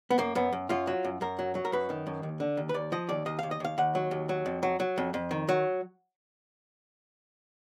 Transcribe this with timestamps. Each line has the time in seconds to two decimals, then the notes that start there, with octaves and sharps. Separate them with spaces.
0.10 B3
0.18 F#2 A#3
0.35 F#2 B3
0.52 F#2
0.69 F#2 F4
0.87 F#3
1.04 F#2
1.21 F#2 A#4
1.39 F#3
1.55 F#3
1.65 A#4
1.72 F#2 B4
1.90 D#3
2.07 F#2
2.23 D#2
2.40 D3
2.57 D#2
2.69 B4
2.74 D#2 D5
2.92 F3 D#5
3.09 D#2 D5
3.26 D#2 D#5
3.39 D#2 F5
3.51 D#5
3.60 D#2 F5
3.78 D#2 F#5
3.95 F#3
4.11 D#2
4.29 F#3
4.46 F2
4.63 F#3
4.80 F#3
4.98 F2
5.14 F2
5.31 D#3
5.49 F#3